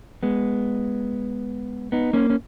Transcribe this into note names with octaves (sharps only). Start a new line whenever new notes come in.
G#3 B3
B3 D#4
A#3 C#4
C#4